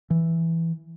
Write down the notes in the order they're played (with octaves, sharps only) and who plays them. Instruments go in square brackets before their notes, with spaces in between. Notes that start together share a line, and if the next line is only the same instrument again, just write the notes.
[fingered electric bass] E3